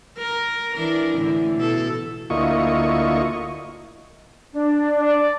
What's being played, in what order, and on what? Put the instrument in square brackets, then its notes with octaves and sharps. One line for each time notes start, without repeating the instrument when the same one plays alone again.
[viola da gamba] A#4
E3 D4 A#4
A2 D3 E3
B2 E4 A4
[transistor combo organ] D2 A#3 E4 F4 D#5 C#6
[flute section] D4
[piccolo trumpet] D5